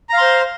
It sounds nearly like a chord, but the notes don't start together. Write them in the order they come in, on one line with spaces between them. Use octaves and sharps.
A#5 F5 C6 C5